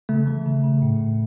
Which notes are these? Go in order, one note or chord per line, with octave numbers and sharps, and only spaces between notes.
C#3 A3
E3
C#3
C#3
A2
A2